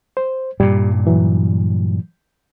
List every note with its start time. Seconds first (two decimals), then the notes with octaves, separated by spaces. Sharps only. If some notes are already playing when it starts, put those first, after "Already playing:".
0.17 C5
0.60 G2 A#2 G3
1.07 E3 F#3